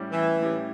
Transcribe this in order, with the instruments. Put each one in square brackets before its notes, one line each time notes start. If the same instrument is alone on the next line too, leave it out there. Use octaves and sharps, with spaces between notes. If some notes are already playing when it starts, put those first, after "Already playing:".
Already playing: [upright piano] A2 G3 C#4 G4
[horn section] E3
[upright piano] A2 G3 C#4 G4